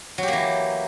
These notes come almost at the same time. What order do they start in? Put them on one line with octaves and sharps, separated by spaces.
F#3 G4 A#3 E3